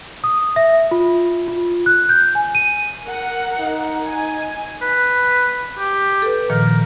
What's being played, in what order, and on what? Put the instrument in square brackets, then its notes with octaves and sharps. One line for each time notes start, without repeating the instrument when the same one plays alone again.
[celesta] D#6
E5
F4
F4
F#6
G6
G#5
D#7
[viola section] A#4 F#5
[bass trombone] D#4
[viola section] G#5
[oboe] B4
G4
[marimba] A4 B4
[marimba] A#2 D#3 F3 [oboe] A#4